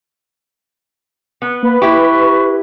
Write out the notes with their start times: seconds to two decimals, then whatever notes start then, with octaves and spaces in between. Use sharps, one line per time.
1.42 B3
1.63 A#3 B4
1.82 E4 G4 C#6